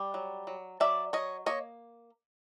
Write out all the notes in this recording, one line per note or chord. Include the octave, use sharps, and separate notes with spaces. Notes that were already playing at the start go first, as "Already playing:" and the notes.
Already playing: G3
F#3
F#3
F#3 D5 E5
F#3 C#5 D#5
A#3 C#5 D#5